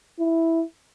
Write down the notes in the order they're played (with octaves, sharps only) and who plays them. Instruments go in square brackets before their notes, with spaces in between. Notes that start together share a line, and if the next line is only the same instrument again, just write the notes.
[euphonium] E4